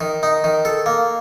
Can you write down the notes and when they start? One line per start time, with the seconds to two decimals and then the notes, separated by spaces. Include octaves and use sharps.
0.01 D#3
0.23 D#4
0.44 D#3
0.65 A4
0.86 A#3